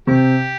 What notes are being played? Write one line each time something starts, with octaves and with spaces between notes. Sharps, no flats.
C3 G4